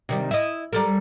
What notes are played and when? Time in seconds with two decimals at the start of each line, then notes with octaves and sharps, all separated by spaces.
0.09 C3 D#3 G3
0.31 E4 D#5
0.73 G3 A4 A#4